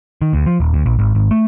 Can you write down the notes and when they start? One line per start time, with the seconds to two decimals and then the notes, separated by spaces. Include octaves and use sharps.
0.22 D#3
0.33 D2
0.46 F3
0.60 D#1
0.74 D2
0.86 A#1
0.99 G#1
1.15 G#1
1.31 A3